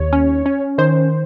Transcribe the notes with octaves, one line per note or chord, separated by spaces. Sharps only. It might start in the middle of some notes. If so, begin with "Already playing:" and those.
Already playing: D#2 C#5
C#4
C#4
D#3 C5